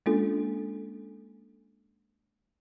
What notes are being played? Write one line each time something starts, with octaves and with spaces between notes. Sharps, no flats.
G#3 A#3 C#4 D4 F4 A4